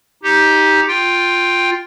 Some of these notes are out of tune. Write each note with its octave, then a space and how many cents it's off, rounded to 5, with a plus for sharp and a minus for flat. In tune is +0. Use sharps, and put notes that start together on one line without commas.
D#4 +15 G4 +0
F4 +5 G5 +0